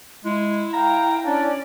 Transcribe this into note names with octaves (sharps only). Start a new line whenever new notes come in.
G#3 E4
F5 G5 A#5
C#4 D4 D5